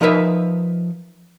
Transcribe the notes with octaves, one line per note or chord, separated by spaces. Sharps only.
F3 D#4 A#4 B4 E5